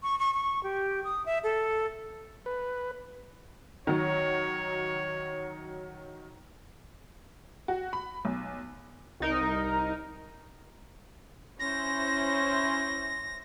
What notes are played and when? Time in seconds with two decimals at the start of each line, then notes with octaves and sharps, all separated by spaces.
0.03 C#6
0.19 C#6
0.34 C#6
0.63 G4
1.04 D#6
1.26 E5
1.44 A4
2.46 B4
3.87 D#3 F#3 C#5
7.68 F#4
7.93 B5
8.25 B1
9.20 C2 D#4 A#4
11.60 C#4 E4 C5 A#6